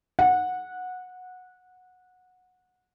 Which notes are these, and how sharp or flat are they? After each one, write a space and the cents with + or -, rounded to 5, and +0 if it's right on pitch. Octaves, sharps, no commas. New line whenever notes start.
F#5 -15